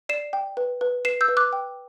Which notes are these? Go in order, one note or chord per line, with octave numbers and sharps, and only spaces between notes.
D5 C7 E7
G5
B4
B4
B4 C7 E7
E6 G6
B4
D6 F#6
G5